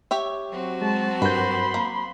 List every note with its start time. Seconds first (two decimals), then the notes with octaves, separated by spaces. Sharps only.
0.11 G4 C#5 E5
0.50 F#3 C4 F#4
0.82 G#3 A5
1.22 G2 A#4 B4 B5 C6 G6
1.74 A#3